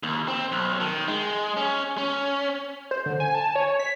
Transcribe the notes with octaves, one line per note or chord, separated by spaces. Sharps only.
D#2
C4
B1
D#3
G#3
C#4
C#4
C5
D3
G#5
A5
C#5
B6